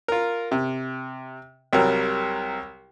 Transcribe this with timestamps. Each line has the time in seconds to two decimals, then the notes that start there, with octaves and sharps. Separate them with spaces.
0.08 F4 A#4
0.52 C3
1.73 C2 F#3 G3 A#4